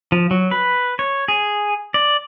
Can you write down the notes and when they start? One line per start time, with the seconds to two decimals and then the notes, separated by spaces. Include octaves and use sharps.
0.12 F3
0.31 F#3
0.51 B4
0.99 C#5
1.28 G#4
1.94 D5